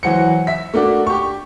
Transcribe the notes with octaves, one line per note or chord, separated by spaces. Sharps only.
E3 F#3 F#4 C5 C#7
E5 B6
A3 A#3 D4 F#4
G4 C#6